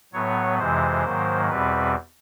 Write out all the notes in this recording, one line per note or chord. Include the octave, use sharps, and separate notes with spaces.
A2 F#3 B3 C#5
F2 C3 E3 G#3 C5
G#2 D#3 F#3 A#3
E2 B2 G3 C4 B4